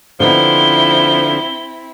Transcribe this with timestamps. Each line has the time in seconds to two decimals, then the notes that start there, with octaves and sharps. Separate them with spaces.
0.20 D3 F3 B3 C4 D#4 E4 G7